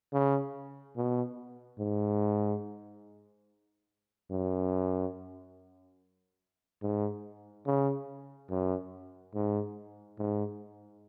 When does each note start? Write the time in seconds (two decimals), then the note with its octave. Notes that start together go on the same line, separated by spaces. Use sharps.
0.13 C#3
0.96 B2
1.79 G#2
4.31 F#2
6.83 G#2
7.66 C#3
8.50 F#2
9.35 G#2
10.18 G#2